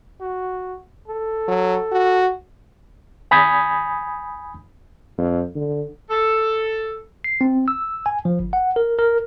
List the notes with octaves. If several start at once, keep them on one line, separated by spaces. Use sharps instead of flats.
F#4
A4
F#3
F#4
G#5 B5 D#6 G6 G#6
F2
D3
A4
C7
C4
E6
G#5
F3
G1
F#5
A#4
A#4